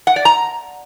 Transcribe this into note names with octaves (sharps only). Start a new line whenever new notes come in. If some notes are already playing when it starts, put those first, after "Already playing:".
F#5
D5
A#5